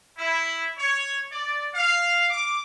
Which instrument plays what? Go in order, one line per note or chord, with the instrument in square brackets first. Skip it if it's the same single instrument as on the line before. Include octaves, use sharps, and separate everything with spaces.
[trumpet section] E4
C#5
D5
F5
D6